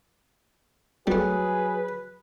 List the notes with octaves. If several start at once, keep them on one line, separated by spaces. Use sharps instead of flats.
F#3 G3 A3 G#4 B4